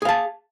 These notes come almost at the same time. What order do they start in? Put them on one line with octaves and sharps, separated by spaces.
G#4 F5 A5